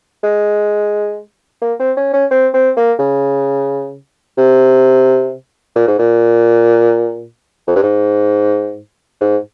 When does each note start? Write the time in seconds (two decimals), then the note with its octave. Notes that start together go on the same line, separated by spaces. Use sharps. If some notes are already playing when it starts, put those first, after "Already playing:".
0.23 G#3
1.61 A#3
1.80 C4
1.97 C#4
2.13 C#4
2.31 C4
2.54 C4
2.77 A#3
2.99 C#3
4.37 C3
5.76 A#2
5.88 G#2
5.99 A#2
7.68 F2
7.75 G2
7.83 G#2
9.21 G#2